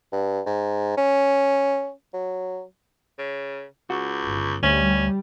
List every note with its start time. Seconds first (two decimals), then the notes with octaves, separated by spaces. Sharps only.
0.12 G2
0.46 G#2
0.97 C#4
2.14 F#3
3.19 C#3
3.90 C#2 F#4
4.24 G1
4.63 D2 G3 C#4